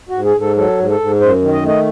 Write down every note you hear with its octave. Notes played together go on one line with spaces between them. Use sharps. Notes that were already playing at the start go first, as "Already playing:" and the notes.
G#2 F#4
G#4
G#2 A4
F#3 A4
G#2
A4
G#2
F#2 C5
D#3
D#5
A3
D#5